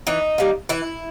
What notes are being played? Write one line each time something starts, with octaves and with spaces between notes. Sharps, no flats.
E3 D#4
G3 A#3
E3 E4